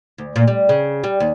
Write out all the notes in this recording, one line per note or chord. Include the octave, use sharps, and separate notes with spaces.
D2
A#2
G3
C#3
G3
D#2